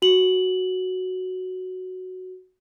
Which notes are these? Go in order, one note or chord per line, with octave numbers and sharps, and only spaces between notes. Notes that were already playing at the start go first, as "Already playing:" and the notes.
F#4 F#7